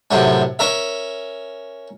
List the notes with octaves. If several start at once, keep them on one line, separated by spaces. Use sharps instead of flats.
F#2 A2 C3 C#4
C#4 A#4 E5